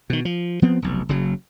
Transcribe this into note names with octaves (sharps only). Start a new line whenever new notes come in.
B2 D#3
F3
F3 B3 C4
F1 B1
F#1 C#3 F#3